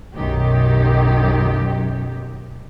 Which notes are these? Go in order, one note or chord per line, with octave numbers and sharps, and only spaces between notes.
B1 F#2 D#3 G4